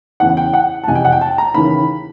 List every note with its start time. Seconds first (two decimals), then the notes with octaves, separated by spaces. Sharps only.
0.20 E2 C#3 E3 F#5
0.37 G5
0.53 F#5
0.84 A5
0.87 F2 C3 E3 G#5
0.95 G5
1.05 F#5
1.12 G5
1.21 A5
1.38 A#5
1.54 D#2 C#3 E3 B5